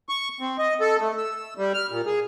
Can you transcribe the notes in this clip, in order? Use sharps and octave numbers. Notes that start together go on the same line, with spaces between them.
C#6
C4
D#5
A4
A3
E6
G3
F6
A#2
G#4